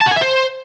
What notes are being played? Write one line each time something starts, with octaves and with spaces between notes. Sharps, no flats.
A5
F#4
G#5
E5
C5